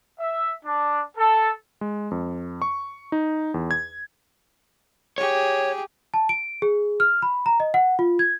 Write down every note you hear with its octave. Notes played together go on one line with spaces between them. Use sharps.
E5
D4
A4
G#3
F2
C#6
D#4
E2
G#6
G4 G#4 C#5
A5
D7
G#4
F6
B5
A#5
D#5
F#5
F4
G#6